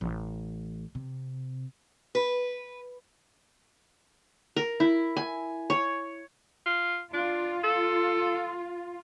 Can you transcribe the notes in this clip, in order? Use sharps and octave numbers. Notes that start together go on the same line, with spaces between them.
A1
C3
B4
A#4
E4
G#5
C#5
F4
D4 F4
A4